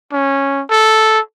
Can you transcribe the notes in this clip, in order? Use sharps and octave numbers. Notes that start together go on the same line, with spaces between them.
C#4
A4